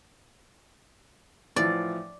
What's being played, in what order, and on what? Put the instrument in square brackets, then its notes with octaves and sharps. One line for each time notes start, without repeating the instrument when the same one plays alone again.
[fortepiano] A2 E3 F3 [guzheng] D5